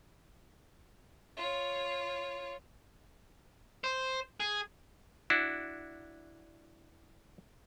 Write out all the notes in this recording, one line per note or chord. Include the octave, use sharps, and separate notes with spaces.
F4 C#5
C5
G#4
D4 E4 F#4